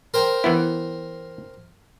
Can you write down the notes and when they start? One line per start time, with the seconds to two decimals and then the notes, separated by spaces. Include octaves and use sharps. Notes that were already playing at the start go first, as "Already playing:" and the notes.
0.14 A#4 C5 G5
0.44 E3 B3 E4